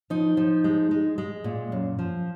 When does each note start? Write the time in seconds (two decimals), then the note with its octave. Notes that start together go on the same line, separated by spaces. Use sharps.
0.10 F3 D#4
0.37 F3
0.64 G#3
0.91 G#3
1.18 G#3
1.44 A#2
1.72 F#2
1.99 F3